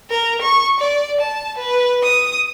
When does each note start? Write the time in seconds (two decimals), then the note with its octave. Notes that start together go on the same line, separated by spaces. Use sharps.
0.10 A#4
0.42 C#6
0.80 D5
1.21 A5
1.58 B4
2.03 D#6